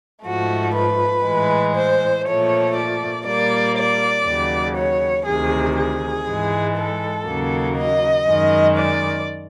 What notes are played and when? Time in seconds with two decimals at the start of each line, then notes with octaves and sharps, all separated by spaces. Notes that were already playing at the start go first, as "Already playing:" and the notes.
0.25 G#2 F3 A3 F#4
0.75 B4
1.25 A2 E3 G#3
1.75 C5
2.26 A#2 F3 A3 C#5
2.75 D5
3.26 A#2 G3 A#3 D5
3.76 D5
4.26 D#2 C#3 F#3
4.76 C#5
5.26 D2 C3 D#3 G#4
5.76 G#4
6.27 G#2 E3 G#3
6.76 A4
7.27 D#2 C#3 F#3 A#3
7.76 D#5
8.27 F#2 D#3 G#3
8.77 D5